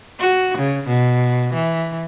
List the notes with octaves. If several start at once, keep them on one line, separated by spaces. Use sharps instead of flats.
F#4
C#3
B2
E3